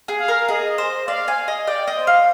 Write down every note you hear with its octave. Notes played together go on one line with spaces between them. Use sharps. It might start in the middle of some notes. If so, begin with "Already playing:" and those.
G#4
F5
A#4
G#4 D#5
C5
D5 F5
G#5
D#5
D5 G5
D#5
C5
F5